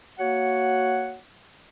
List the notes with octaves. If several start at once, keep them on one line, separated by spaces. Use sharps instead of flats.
A#3 F#4 C#5 F#5